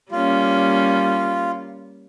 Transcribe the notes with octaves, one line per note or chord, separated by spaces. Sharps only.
G3 A#3 C#4 F4